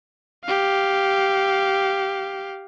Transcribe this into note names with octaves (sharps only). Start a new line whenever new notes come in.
G4 F5